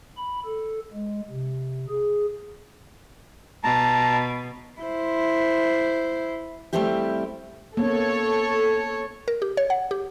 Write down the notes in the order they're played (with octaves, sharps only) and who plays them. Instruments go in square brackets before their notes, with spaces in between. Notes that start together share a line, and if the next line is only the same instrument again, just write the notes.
[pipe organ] B5
A4
G#3
C3
G#4
[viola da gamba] B2 [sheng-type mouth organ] A5 A#5
[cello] E4 C5
[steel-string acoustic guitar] G3 A3 C4 E4 F4 G4
[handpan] A#3 B3 C#4 [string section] A4 C#5
[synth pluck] A#4
G4
C#5
F#5
G4